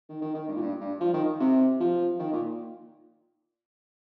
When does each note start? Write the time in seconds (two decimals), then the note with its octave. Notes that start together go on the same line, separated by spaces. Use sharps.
0.09 D#3
0.22 D#3
0.35 D#3
0.48 G2
0.55 A#2
0.61 G2
0.80 G2
1.00 F3
1.14 D#3
1.40 C3
1.80 F3
2.19 D#3
2.32 A#2